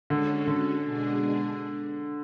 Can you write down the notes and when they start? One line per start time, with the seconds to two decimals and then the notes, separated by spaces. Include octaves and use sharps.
0.10 D3 G#3 C#4 F#4 A4
0.47 D3
0.85 B2 G#3 D4 G#4